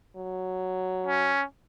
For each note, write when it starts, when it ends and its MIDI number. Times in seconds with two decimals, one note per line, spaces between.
0.16 1.35 54
1.07 1.44 61